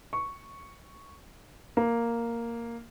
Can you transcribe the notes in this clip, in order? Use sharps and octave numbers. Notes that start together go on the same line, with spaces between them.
C#6
A#3